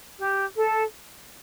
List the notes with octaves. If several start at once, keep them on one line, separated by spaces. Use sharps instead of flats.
G4
A4